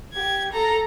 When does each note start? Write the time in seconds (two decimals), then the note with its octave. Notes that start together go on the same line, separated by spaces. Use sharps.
0.14 G4 G#6
0.52 A4 A#5